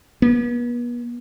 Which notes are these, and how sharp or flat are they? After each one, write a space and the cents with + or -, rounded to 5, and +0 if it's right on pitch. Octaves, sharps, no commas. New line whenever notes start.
B3 -40